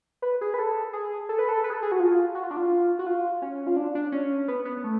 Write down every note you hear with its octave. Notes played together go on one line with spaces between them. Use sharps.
B4
G#4
B4
A4
G#4
A4
B4
A4
B4
G#4
A4
G#4
F#4
F4
F#4
F4
D4
F4
F#4
F4
C#4
F4
D4
D4
C#4
B3
B3
B3
A3